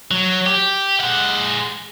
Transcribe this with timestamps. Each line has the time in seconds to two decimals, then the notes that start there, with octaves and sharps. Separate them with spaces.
0.11 F#3
0.46 G4
1.00 G#3 F#5